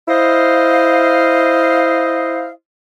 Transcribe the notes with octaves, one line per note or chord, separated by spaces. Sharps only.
E4 C5 D#5 F5